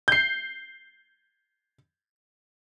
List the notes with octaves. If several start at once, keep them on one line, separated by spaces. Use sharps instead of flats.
G6 C7